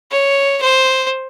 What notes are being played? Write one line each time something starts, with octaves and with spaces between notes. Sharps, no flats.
C#5
C5